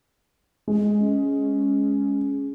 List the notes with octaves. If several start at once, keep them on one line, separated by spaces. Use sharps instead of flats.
G#3
C#4